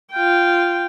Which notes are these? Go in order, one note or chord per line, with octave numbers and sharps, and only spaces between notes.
F4 G5